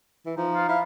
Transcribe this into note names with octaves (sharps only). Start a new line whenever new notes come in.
E3
F3 D#4
F4
E4 F5